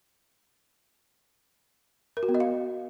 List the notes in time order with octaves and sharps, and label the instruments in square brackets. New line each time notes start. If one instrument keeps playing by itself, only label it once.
[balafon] A#4
F#4
B3
D#5
F5